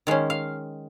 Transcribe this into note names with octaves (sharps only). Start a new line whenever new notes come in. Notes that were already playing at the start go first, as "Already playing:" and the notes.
D#3 G#3 C#4 F5
F5